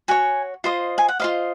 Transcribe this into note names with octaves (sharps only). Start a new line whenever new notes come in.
F#4 C#5 G#5
F4 C5 D#5
G#5
F#5
F4 C5 D#5 F5